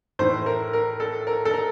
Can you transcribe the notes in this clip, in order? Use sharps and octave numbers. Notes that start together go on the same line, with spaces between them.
A2 E3 C5
A#4
A#4
A4
A#4
A4
A#4